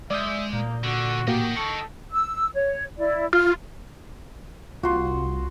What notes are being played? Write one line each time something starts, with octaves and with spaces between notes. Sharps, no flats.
G#3 D5 E5 D#6 G6
A#2 A#3
D3 F#4
A2 A#3 F#4 G4 D#5 G5
A4 C#6
E6
C#5
E4 D5
F4 F6
C2 F4 F#4 C6